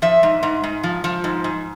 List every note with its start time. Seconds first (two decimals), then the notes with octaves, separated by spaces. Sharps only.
0.02 F3 E5
0.23 G#2
0.43 G#2
0.63 G#2
0.83 F3
1.04 F3
1.24 G#2
1.44 G#2